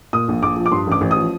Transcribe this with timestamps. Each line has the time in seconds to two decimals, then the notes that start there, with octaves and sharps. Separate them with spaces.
0.13 A#2 D#6
0.28 A#1
0.42 A#1 D6
0.57 F3
0.66 D6
0.72 G2 C6
0.87 A1 D6
1.01 A1
1.11 D#6
1.17 F3